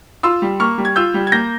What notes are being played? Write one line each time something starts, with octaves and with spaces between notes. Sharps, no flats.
F4 C6 E6
G3
A#3 C#6 F6
G3
G#6
F4 E6 G6
G3
G#6
A#3 G6 A#6